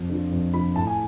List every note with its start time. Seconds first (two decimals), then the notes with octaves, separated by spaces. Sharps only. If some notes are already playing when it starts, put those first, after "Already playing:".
Already playing: F2
0.09 D3 F3
0.31 F2
0.53 D3 F3 B5
0.76 A2 A5
0.87 G#5